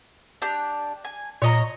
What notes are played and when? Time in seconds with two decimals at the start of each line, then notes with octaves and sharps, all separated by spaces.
0.42 D4 G4 F#6
1.04 G#5
1.42 A#2 C#5 D#5 A#5